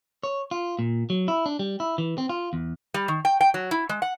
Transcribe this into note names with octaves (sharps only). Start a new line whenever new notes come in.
C#5
F4
A#2
F#3
E4
D4
G3
E4
E3
C4
F4
E2
G3
D#3
G5
G5
F#3
E4
G#3
F#5